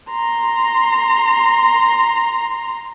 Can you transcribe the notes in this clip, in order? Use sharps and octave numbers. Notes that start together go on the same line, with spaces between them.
A#5 C6